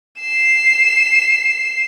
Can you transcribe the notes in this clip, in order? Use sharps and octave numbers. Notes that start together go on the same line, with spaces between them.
C7 E7